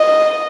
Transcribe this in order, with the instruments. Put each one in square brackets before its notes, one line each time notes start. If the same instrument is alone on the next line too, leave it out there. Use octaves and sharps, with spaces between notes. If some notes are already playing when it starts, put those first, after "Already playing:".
Already playing: [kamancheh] D#5